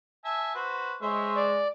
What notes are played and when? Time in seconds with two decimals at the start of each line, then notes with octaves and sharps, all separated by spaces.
0.25 E5 G#5 A5
0.55 F#4 B4 C5
1.01 G#3 C5 C#5 E5
1.36 D5